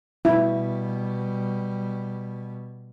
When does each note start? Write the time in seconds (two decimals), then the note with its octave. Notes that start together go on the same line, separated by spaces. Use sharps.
0.25 B2 G3 E4